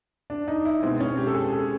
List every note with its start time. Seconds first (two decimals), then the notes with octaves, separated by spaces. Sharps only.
0.30 D4
0.48 D#4
0.65 E4
0.82 B2 G#3 C4
1.00 C#4
1.17 G4
1.27 A4
1.35 G#4
1.52 G#4